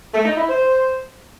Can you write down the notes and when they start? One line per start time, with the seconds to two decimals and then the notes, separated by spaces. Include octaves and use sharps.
0.13 A3
0.25 D#4
0.37 E4
0.48 C5